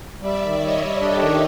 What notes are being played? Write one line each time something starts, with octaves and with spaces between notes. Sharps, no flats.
G3 D5 E5
D#3
G3 C#5 D#5
G3
D4 G4 A4
D#3